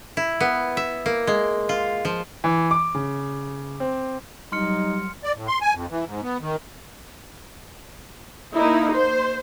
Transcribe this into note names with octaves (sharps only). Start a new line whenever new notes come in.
E4
B3
E5
A#3
G#3
F4
F3
E3
D6
C#3
C4
F#3 G3 D#4 C6 F6 C#7
D5
A2
C6
G#5
F2
E3
G#2
B3
D#3
A#3 D#4 E4
C5